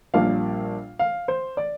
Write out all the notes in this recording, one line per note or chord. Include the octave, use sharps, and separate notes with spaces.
A#1 A#2 G3 A#3 D4 F5
F5
C5
D5